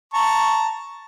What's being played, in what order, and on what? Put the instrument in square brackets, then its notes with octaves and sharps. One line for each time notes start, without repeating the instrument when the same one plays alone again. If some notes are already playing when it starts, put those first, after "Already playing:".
[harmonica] A5 A#5 C#6